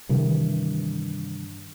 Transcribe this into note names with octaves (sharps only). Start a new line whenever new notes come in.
G2 C3 D#3 E3